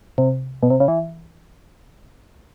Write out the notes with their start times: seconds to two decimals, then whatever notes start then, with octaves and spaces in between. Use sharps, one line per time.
0.18 C3
0.63 B2
0.70 C3
0.80 C#3
0.88 E3